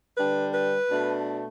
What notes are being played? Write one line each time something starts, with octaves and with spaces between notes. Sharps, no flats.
D3 G3 D4 B4
B4
B2 A3 D4